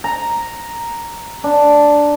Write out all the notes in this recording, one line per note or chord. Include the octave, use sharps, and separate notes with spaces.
A#5
D4